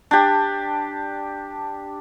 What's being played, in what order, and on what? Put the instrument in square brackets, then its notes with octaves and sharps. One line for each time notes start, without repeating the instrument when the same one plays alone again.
[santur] D4 G4